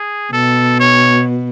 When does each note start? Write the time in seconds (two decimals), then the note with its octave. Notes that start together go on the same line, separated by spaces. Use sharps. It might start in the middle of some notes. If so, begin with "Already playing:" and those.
Already playing: G#4
0.33 B2 A4
0.80 C#5